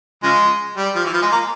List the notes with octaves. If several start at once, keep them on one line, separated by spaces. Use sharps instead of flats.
C#3 F3 G#3
G3
F3
E3
F3
G#3
A#3